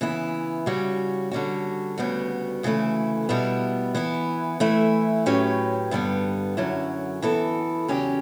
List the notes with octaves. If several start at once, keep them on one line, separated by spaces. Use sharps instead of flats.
C#3 E3 B3 E4
C#3 G3 C#4 F#4
D3 G3 C#4 F#4
D2 C#3 G3 B3 F#4
D2 C#3 E3 A3 E4
B2 G3 B3 E4
E3 B3 E4
E3 A3 E4
A2 F#3 C#4 G4 B4
G2 D3 G3 B3
F#2 D3 F#3 C#4 E4
F#2 E3 B3 E4 A4
E2 C#3 F#3 C#4 G4